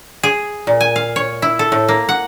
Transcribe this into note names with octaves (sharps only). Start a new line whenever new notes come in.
G#4
A#2
G#5
F5
C#5
E4
A4
A2
A#3
F#5